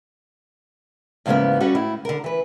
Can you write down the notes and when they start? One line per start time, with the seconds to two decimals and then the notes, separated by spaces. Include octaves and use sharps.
1.26 E2 G#2 C#3 F3 A#3 B3
1.60 G3 C#4 F#4 A4
1.75 A2 E4
2.05 D3 A#4
2.24 E3 B4